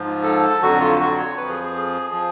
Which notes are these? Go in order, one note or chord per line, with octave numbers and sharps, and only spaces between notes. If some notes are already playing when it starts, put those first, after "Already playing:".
Already playing: G#2 F3
A4
F2 D3 F#3 F#4
F4
F#4
C#5
F2 F3 B4
G#4
G#4
G#4
F3